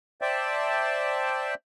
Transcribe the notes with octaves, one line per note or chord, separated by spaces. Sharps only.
C5 D5 E5 G5 A5